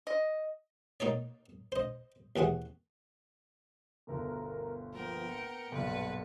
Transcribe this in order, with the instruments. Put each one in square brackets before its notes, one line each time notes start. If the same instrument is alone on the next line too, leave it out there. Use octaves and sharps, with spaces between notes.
[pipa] D#5
[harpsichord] A#3 D#4 C#5 D5
C5 D#5
D#2 E3 F#4 G#4 F#5
[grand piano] G1 D2 B2 [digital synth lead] A#4
[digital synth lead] F3 [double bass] A#3 B3 [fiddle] A#4 G5
[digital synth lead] C#7
[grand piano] B1 A#2 [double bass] G2 D3 [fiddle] B4